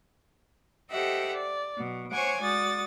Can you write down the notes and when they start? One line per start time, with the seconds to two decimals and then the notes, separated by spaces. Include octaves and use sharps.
0.90 G4 A4 C5 D#5 E5 F#5
1.34 D5
1.77 B2 F#3
2.11 C5 C#5 F#5 G#5 C#6 D6
2.41 G#3 F#4 D5 D#6 A6